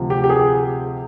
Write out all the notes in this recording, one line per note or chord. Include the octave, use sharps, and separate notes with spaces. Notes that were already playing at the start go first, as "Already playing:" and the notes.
Already playing: D2 C3 F3
G4
G4
G#4